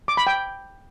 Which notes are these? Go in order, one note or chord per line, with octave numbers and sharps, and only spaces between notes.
D6
B5
G5